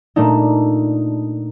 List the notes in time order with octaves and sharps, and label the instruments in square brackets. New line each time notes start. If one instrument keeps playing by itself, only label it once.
[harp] A#2 A3 D4 D#4